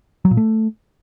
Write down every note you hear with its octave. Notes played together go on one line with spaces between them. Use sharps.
F#3
A#2
A3